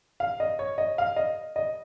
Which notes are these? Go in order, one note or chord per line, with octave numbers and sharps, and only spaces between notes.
F5
D#5
C#5
D#5
F5
D#5
D#5